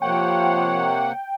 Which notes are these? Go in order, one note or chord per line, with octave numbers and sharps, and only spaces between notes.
C3 F3 A#3 C#5 F#5 G5